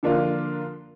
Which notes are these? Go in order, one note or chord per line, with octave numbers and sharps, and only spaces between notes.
D3 F3 A#3 D4 F4